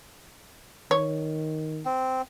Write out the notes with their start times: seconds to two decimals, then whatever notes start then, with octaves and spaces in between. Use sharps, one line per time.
0.91 D#3 C#5
1.85 C4